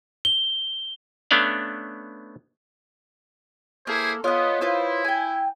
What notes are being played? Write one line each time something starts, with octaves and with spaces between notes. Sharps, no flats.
G7
A3 B3 C#4 D4 D5 F5
A#3 E4 G#4 A4 C5
B3 F4 C#5 D#5 D#6
E4 F4 B4 C5
G5 G#5